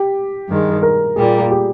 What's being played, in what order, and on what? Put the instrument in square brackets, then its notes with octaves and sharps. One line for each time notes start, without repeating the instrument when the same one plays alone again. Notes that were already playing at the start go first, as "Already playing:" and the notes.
Already playing: [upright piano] G4
[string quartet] G2 D#3 G#3
[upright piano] A#4
[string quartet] A#2 G3 A#3 [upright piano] G#4
[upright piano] G4